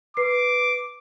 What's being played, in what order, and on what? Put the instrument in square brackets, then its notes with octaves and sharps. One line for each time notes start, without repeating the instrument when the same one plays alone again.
[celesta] B4 C7 [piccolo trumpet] D6